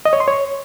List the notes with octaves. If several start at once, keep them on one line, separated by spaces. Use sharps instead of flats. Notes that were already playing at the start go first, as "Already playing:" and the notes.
D#5
C#5
C6
C#5